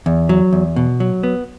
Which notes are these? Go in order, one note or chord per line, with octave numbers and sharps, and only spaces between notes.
E2
F#3
E2
B2
F#3
B3